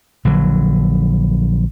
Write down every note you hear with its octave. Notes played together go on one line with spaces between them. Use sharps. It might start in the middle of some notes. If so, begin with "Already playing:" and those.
A#1 D3 F#3